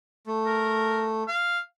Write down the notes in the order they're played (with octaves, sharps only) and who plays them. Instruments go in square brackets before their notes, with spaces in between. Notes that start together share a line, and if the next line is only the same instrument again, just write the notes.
[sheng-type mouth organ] A3
[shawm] A#4
F5